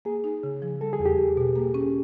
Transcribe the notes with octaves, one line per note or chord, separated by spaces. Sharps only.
A#3 G#4
D#4
C#3
F3
G3 A4
G#4
E2
G4
E2
B2
A#3
C#4